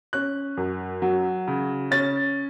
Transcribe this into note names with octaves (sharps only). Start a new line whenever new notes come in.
C#4 F#6
F#2
F#3
C#3
C#4 A6